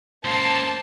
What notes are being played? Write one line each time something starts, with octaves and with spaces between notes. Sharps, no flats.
C#2 A#3 C5 A5